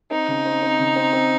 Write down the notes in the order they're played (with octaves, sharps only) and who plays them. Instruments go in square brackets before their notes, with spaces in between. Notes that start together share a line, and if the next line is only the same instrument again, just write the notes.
[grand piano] C4 [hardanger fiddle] D#4
[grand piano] C#3
C4
C4
C#3
C4
C4